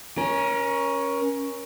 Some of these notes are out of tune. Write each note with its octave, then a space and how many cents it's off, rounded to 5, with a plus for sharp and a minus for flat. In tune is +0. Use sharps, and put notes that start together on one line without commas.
C#4 +0 A#4 +30